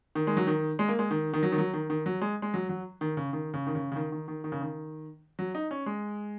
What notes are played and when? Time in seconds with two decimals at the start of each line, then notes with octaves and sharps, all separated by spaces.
0.15 D#3
0.27 G#3
0.37 F#3
0.47 D#3
0.79 G#3
0.88 A#3
0.99 G#3
1.11 D#3
1.33 D#3
1.43 F#3
1.52 D#3
1.58 F#3
1.74 D#3
1.90 D#3
2.06 F#3
2.21 G#3
2.42 G#3
2.54 F#3
2.69 F#3
3.01 D#3
3.17 C#3
3.33 D#3
3.54 C#3
3.67 D#3
3.75 C#3
3.92 C#3
3.96 D#3
4.12 D#3
4.28 D#3
4.44 D#3
4.52 C#3
4.61 D#3
5.39 F#3
5.55 D#4
5.71 C#4
5.86 G#3